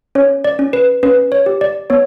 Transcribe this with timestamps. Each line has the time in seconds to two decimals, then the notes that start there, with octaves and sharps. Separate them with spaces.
0.15 C#4 C#5
0.44 D5
0.59 C#4
0.73 B4
1.03 C#4 B4
1.32 C#5
1.46 G4
1.61 D5
1.90 B3 C#5